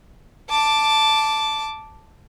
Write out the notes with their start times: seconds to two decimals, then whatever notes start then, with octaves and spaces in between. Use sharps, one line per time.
0.51 A5 D6